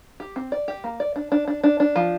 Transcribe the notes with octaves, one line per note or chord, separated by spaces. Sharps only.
G4
C4
D5
G4
A#3
D5
D4
D4
D4
D4
D4
F3